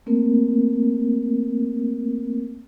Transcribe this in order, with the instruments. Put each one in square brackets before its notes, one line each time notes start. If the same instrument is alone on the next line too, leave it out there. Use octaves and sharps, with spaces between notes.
[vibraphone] A3 A#3 C4 A#4